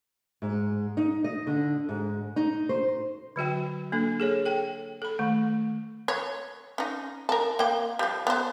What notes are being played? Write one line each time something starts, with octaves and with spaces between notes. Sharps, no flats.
G#2
D#4
D#5
D3
G#2
D#4
C5
D3 F#3 F#4 G5
A#3 D4 A4
G#4 A4 C#5
A4 G5
A4 B5
D#3 A3
C#5
C#4 D#4
A4 A#4
A#3 G5
F3 G3
B3 C5